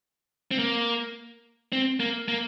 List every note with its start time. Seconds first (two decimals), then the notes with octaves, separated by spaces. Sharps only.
0.51 C4
0.59 A#3
1.72 C4
2.00 A#3
2.28 A#3